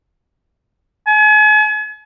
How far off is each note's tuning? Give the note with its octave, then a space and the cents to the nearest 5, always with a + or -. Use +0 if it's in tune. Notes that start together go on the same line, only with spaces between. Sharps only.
G#5 +40